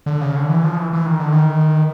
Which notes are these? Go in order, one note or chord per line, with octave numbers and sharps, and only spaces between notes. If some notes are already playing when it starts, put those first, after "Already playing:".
D3
C#3
D3
E3
F3
E3
E3
D#3
D3
D#3